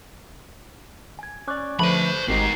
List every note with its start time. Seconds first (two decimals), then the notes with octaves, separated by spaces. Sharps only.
1.19 G#5 G#6
1.48 C#4 D5 C#6 D6 F#6
1.79 D3 F3 A3 B4 C5 B5
2.28 G#1 G#2 D#4 G4 A#4 C7